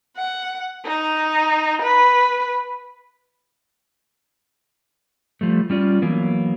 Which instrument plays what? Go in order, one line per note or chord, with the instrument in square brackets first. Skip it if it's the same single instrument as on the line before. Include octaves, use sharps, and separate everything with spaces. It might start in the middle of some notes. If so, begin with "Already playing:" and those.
[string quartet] F#5
D#4
B4
[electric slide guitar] F3 G3 A3
G3 C#4 F4 D5
E3 F#3 A#3 B3